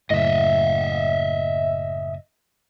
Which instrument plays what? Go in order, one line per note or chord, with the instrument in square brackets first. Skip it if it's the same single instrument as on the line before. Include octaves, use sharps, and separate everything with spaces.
[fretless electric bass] F#1 A2 [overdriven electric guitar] D#5 E5